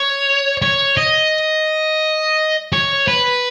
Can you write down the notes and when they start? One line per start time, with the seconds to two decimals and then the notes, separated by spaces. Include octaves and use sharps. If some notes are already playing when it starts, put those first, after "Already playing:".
Already playing: C#5
0.62 C#5
0.97 D#5
2.73 C#5
3.08 B4